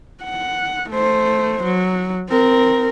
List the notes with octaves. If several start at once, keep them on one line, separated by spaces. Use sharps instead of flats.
F#5
A3 C5
F#3
C4 A#4